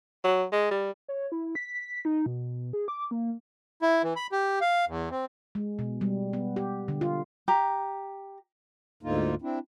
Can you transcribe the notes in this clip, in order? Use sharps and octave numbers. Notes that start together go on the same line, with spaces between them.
F#3
G#3
G3
C#5
E4
B6
D#4
B2
G#4
D6
A#3
E4
E3
B5
G4
F5
E2
C4
G#3
B2
G3
B3
G4
D3
F4
G4 A#5
D2 G#2 D3 A#3 D#4 F4
C4 D4 E4